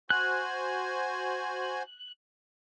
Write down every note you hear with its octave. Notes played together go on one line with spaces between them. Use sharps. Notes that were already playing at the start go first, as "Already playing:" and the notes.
F#4 C5 G#5 F#6